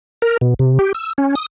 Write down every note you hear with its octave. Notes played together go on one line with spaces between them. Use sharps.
A#4
B2
C3
G4
E6
C#4
D#6